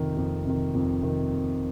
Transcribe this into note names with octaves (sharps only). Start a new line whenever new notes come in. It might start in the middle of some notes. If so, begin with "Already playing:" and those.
Already playing: F2 C3 D#3
F2
C3 D#3
F2
C3 D#3